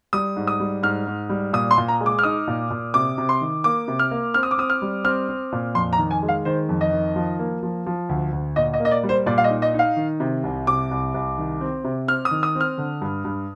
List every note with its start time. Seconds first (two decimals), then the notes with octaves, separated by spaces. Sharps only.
0.13 G3 D#6
0.36 G#2
0.47 D#6
0.60 G3
0.83 G#2 F6
1.07 G#2
1.29 G3
1.53 A#2 D#6
1.71 C6
1.78 A#2
1.88 A#5
2.01 G#3
2.06 D6
2.19 F6
2.23 D#4 D#6
2.47 A#2
2.70 A#2
2.94 C3 D6
3.18 C3
3.29 C6
3.41 D#3
3.64 A#3 D6
3.88 C3
3.99 F6
4.11 A#3
4.34 C4 F6
4.43 D#6
4.51 D6
4.58 C4 D#6
4.70 F6
4.82 G3
5.04 C4 F6
5.29 C4
5.52 A#2
5.75 F2 C6
5.93 A#5
5.98 D#3
6.11 G#5
6.23 G#3
6.28 F5
6.45 D#3 C5
6.69 F2
6.81 D#5
6.93 D#3
7.16 F3
7.39 A#3
7.63 F3
7.86 F3
8.09 D2
8.32 D2
8.56 A#2 D#5
8.74 D#5
8.80 A#3
8.85 D#5
8.91 D5
9.03 G3
9.09 C5
9.26 A#2 D5
9.38 F5
9.44 D#5
9.50 D#4
9.62 D#5
9.74 D#4
9.79 F5
9.96 D#3
10.20 C3
10.43 C2
10.67 C3 D6
10.91 C2
11.14 C2
11.38 D#3
11.61 C4
11.84 C3
12.07 C4 F6
12.25 D#6
12.31 D#3
12.43 D#6
12.55 C4
12.60 F6
12.78 D3
13.02 G2
13.25 G2